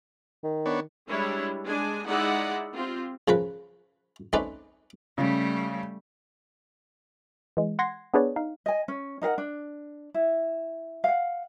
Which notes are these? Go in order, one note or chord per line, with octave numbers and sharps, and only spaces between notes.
D#3
B3 D4 C#5
G3 G#3 D4 E4 C#5
G#3 D4 G#5
G#3 D#4 E4 D5 E5 F#5
C4 F4 G4
C#3 F3 A#4 B4
A3 C4 C#4 D#4 B4 D5
C#3 G3 A3
E3 G#3
F#5 C6 G#6 A#6 C7
B3 D4 G#4 B4 C#5 D5
D#4 F5
D#5 G#5
C#4
D#4 A#4 F5 F#5
D4
E4
F5 F#5